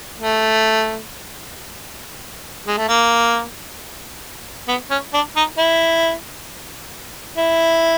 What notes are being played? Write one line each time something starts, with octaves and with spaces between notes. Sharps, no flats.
A3
G#3
A3
A#3
B3
C#4
D4
D#4
E4
E4